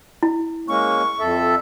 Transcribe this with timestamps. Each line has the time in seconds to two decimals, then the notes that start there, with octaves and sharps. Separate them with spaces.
0.23 E4
0.68 G#3 A#3 C#4 C#6
1.19 F2 A4 E5